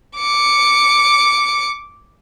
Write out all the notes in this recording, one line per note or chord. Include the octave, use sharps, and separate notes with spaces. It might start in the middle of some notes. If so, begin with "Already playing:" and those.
D6 C#7